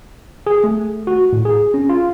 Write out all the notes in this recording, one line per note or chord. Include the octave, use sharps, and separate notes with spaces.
G#4
A3
F#4
A2
G#4
C#4
F4